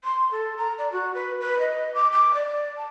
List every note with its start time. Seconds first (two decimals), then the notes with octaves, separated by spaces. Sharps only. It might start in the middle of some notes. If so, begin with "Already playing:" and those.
0.04 C6
0.31 A4
0.57 A#5
0.78 D5
0.92 F#4
1.14 B4
1.41 B4
1.59 D#5
1.94 D6
2.12 D6
2.34 D5
2.77 A5